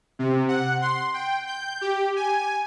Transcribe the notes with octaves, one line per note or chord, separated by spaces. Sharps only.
C3
F#5
C6
G5
G6
G4
G#5